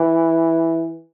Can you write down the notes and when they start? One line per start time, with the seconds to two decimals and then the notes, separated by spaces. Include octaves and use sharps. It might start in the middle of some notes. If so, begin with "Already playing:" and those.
Already playing: E3